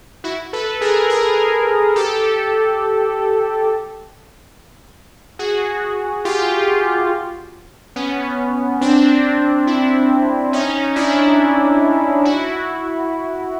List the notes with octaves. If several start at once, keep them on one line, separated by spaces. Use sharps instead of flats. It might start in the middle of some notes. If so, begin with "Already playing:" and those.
E4 F#4
A4 B4
G#4 A#4
G#4 A#4
G4 A4
F#4 G#4
F4 G4
B3 C#4
C4 D4
D4 E4
C#4 D#4
D4 E4
E4 F#4